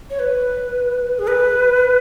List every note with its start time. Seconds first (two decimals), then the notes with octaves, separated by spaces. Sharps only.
0.10 C#5
0.19 B4
1.19 G#4
1.27 B4